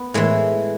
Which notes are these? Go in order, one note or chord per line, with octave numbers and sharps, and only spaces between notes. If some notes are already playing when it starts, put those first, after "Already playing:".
Already playing: B3
A2 E3 G#3